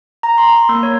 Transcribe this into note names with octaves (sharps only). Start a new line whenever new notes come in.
A#5
C6
C6
A#3
C#5